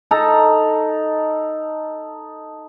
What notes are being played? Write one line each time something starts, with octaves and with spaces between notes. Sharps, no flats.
D#4 A4 A#5